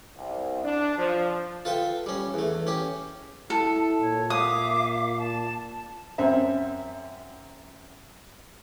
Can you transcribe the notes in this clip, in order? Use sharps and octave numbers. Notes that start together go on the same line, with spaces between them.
C2
D4
F3
F4 A4 B4 E5 G5
G3 C#4
E2 A3
C#4 G4
E4 A4
A#2 C#5
E5 F5 D6 D#6
A5
F#2 C4 E5